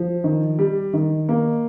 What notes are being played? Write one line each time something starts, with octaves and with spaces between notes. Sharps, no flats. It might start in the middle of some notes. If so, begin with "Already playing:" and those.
Already playing: F3
D#3
G3
D#3
A#3